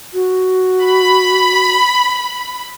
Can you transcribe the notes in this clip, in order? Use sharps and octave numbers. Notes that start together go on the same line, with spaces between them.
F#4
B5